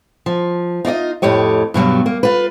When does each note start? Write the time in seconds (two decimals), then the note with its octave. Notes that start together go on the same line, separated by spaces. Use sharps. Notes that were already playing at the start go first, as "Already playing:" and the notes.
0.26 F3
0.85 D#4 F4 D5 D#5
1.22 F2 A2 G4 C#5 D#5
1.74 G2 B2 F#3 G3
2.06 A#3
2.23 F4 B4